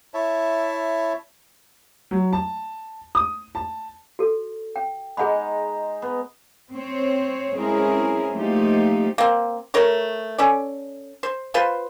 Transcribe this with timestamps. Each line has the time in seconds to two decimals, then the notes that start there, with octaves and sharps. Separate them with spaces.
0.14 E4 C#5 E5 A5
2.11 F#3
2.33 A5
3.15 D#6
3.55 A5
4.19 F#4 A4
4.76 G5
5.17 G#3 D#4 G#4 F#5 B5
6.02 B3
6.73 C4 C#5
7.55 G#3 C4 C#4 E4 G#4 A#4
8.34 F3 A3 A#3 C4 D#4 G4
9.18 A#3 C4
9.74 A3 A#4 C#5
10.38 C#4 A4 D5
11.23 C5
11.54 F4 B4 C5 C6